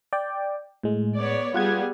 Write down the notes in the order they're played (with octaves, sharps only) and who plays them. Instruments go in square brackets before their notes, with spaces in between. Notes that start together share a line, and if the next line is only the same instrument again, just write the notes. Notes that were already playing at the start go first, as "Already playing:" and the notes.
[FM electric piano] D5 G5
A2 G#3
[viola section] B3 C#5 D5
[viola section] G3 B3 G#4 [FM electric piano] F4 F#5 G#6